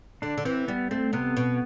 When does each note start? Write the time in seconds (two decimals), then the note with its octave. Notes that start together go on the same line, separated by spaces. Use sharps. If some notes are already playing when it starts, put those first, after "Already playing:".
0.22 D3 D4
0.38 D3
0.45 E3 C4
0.68 G3 B3
0.91 A3 C4
1.13 C3 B3
1.37 B2